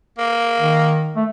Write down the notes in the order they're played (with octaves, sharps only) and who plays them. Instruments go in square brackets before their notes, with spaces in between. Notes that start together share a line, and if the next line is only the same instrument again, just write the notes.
[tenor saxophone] A#3
[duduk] D#3
A3